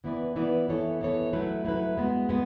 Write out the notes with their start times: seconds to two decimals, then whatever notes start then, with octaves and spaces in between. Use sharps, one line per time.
0.04 E3 B3 E4 B4 D5
0.36 E3 B3 E4 B4 D5
0.68 E3 B3 E4 A4 C#5
1.00 E3 B3 E4 A4 C#5
1.33 F#3 A3 E4 B4
1.65 F#3 A3 E4 B4
1.97 G#3 B3 F#4
2.29 G#3 B3